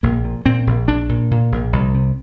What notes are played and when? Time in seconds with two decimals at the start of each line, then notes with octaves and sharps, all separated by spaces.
0.03 A#1 A#3
0.24 A#2
0.46 A#2 C4
0.67 A#1
0.88 A#1 D4
1.09 A#2
1.31 A#2
1.52 A#1
1.73 C2
1.94 C3